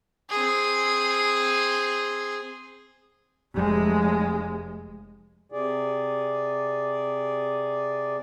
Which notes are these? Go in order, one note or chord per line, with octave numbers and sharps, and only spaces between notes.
C4 G#4
F1 G#3
C3 G#4 D5